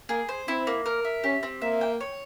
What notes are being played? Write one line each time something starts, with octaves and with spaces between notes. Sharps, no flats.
A#3 G#4
C5
C4 E4
A#3
A#4
E5
C#4 G4
C4
A#3 E5
G5
C#5